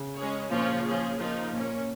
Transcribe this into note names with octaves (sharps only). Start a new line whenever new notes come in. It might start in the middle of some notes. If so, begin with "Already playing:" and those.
Already playing: C#3
G#3 C#4 G#4 C#5
A#2 F3 C#4 F4 C#5
C#3
F3 C#4 G#4
F3 A#3 D#4
A#2 A#3 C#4 A#4